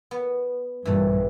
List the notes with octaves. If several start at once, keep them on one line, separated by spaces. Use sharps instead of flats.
B3
A#1 G2 E3 A3